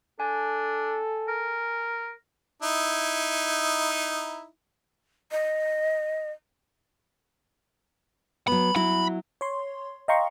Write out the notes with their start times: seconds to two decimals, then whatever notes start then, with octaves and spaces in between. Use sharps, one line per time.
0.20 D4 A4 G#5
1.28 A#4
2.63 D#4 E4
5.31 D#5
8.47 F#3 B3 B5
8.76 F#3 E4 F#4 B5
9.41 C#5 C6
10.08 D#5 F5 G5 A#5 C6 C#6